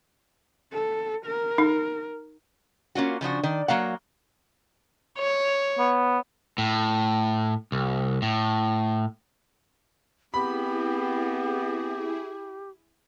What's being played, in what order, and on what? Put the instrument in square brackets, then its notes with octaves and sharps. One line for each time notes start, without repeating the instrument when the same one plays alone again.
[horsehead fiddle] A4
A#4
[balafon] D#4
[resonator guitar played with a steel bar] A#3 C#4 F4 F#4
C#3 F3 D4 F#4
D#3 D5
F#3 A#3 F5 F#5
[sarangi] C#5
[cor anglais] B3
[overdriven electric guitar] A2
C2
A2
[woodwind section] B3 C4 [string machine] E4 G#4 [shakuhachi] G4 [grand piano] B5